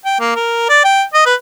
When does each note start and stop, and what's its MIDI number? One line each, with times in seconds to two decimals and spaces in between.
0.05 0.19 79
0.20 0.35 58
0.36 0.66 70
0.69 0.83 74
0.84 1.02 79
1.14 1.24 75
1.26 1.34 71